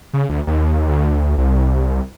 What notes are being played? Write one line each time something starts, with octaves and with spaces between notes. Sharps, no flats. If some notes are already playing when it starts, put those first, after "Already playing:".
C#3
D2
D#2
D2
C2